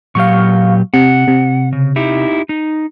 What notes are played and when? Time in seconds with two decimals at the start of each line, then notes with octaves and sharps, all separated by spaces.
0.15 A#2 F#3 G4 F5 C#6
0.94 C3 F#5
1.28 C3
1.73 C#3
1.96 D#4 E4 G4
2.49 D#4